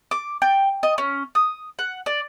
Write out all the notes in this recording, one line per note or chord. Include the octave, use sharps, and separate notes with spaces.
D6
G5
D#5
C#4
D#6
F#5
D5